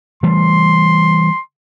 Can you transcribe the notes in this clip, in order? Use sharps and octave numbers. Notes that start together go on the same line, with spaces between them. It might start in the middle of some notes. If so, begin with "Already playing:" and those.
E3 G3 A3 C6